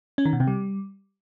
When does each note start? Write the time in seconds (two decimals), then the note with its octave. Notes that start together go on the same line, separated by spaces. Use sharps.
0.18 C#4
0.25 D#3
0.33 B2
0.40 C3
0.47 G3